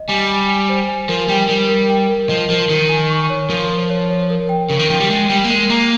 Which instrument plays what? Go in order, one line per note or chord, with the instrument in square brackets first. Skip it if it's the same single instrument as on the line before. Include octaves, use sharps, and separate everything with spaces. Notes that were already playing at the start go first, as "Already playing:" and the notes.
Already playing: [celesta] D#5
[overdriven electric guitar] G3 [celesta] G#5
[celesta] G#5
G#5
C5
G#5
[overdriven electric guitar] F3 [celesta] A#4
[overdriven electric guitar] G3 [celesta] G5
[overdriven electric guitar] G3 [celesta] A#4
[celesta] A#4
G5
A#4
[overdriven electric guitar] F3 [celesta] D#5
[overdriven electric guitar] F3 [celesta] A#4
[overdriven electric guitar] D#3 [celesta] A#4
[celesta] G#5
C#6
C#5
[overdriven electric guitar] F3 [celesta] A#4
[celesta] A#4
C#5
C#5
A#4
G5
[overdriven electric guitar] C#3 [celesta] A#4
[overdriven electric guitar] D#3
[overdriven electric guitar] F3 [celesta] G5
[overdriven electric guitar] G3
[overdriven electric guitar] G#3 [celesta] G5
[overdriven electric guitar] G3 [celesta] G5
[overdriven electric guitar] A#3
[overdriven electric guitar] G#3 [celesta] A#4
[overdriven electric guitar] A#3 [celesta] A#5